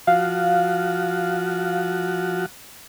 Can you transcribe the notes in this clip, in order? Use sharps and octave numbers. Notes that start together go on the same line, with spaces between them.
F3 F#4 F5